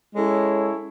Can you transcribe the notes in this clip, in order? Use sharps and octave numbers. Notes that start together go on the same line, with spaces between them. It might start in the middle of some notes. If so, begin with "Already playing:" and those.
G#3 C#4 E4 A4 C#5